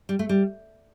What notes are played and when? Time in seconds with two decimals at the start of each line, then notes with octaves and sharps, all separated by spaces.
0.09 G3
0.19 A3
0.29 G3